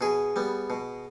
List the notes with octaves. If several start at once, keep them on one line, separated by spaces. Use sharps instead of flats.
B2 G#4
G3 B3
B2